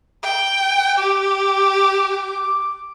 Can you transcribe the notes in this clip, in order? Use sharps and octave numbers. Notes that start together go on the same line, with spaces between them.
G5
G4 D6